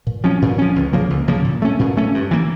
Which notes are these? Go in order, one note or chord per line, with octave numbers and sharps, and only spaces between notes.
A#2
F3 C#4
A#2
F3 C#4
C#2
C#3 F3 A#3
C#2
C#3 F3 A#3
A#2
A3 C#4
A#2
A3 C#4
G2
E3 A#3